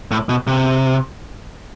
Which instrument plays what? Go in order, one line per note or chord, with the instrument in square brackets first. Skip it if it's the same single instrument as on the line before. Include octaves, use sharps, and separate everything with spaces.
[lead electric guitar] A2
B2
C3